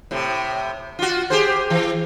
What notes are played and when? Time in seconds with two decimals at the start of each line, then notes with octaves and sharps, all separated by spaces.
0.11 A2 C3
0.99 F4 F#4
1.30 G4 G#4 C5
1.70 E3